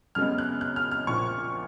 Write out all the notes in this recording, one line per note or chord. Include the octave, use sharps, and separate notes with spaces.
F#2 C#3 G#3 B3 F6
F#6
F#6
F6
F6
A#1 A#2 F3 C#6